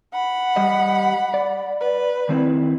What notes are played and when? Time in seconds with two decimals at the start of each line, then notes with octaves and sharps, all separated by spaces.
0.12 F#5 B5
0.56 G3 G4 D#5
1.34 D5
1.80 B4
2.29 D#3 C4 E4